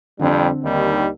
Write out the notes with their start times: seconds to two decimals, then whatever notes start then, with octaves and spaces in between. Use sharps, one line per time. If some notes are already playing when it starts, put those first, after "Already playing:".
0.19 F2 D3 G3 C4
0.63 D#2 D#3 G3